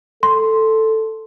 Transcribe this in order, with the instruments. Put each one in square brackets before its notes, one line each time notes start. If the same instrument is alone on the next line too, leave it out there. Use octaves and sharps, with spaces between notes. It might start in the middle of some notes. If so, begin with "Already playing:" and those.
[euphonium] A4 [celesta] C6